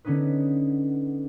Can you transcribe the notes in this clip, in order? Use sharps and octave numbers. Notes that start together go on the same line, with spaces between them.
D3 B3 C#4 D#4 B4